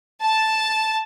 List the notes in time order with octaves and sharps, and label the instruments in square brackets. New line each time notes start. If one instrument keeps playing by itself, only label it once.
[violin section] A5